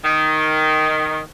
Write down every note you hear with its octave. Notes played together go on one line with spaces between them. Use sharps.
D#3